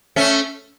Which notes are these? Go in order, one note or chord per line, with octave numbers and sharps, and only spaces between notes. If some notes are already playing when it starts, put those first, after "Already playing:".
A3 C#4